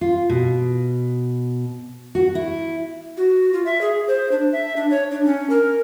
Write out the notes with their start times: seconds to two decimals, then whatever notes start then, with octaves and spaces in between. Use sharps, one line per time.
0.01 F4
0.30 B2
2.15 F#4
2.35 E4
3.17 F#4
3.53 F4
3.65 E5
3.81 G#4
4.07 C5
4.32 D4
4.52 E5
4.76 D4
4.90 C#5
5.11 D4
5.25 C#4
5.50 A#4